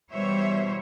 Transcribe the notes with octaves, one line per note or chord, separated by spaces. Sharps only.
B2 E3 G3 C5 C#5 E5